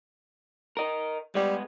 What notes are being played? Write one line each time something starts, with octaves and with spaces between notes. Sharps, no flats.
A#4 D#5
G3 G#3 B3